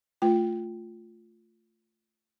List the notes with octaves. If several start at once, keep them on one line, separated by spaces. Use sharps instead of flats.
A3 F4 G5